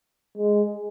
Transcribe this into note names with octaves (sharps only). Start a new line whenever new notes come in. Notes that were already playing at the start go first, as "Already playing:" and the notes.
G#3